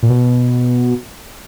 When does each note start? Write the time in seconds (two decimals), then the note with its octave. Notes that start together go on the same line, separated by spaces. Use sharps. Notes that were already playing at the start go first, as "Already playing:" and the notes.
0.03 A#2
0.10 B2